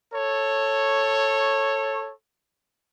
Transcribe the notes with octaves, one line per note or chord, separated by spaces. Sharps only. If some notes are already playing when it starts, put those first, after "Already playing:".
A4 C#5